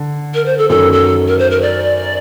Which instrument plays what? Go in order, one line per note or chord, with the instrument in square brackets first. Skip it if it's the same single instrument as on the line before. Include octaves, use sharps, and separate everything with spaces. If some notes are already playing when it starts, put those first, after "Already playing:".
Already playing: [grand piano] D3
[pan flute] A#4
C5
A4
[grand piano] F#2 D#3 F#3 [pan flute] A4
[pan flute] A4
A#4
C5
A#4
D5